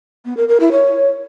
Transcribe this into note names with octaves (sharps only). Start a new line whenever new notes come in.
B3
A#4
A#4
E4
C#5